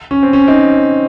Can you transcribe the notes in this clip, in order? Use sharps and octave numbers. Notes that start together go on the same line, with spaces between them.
C#4
C4
C#4
C4 D#4